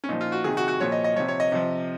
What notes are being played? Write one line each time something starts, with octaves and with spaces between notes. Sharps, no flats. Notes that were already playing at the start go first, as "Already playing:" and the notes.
C#4
A#2 F3 D#4
F4
F#4
C3 D#3 G#4
F#4
F#4
A#2 F3 C#5
D#5
D#5
C3 F3 C#5
C#5
D#5
C3 F3